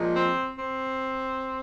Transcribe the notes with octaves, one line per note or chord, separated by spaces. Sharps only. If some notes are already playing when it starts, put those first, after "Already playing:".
Already playing: A#2 F3 G#3
C4
C4